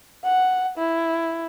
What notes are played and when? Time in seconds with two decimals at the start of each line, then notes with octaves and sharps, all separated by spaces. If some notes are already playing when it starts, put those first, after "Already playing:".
0.24 F#5
0.78 E4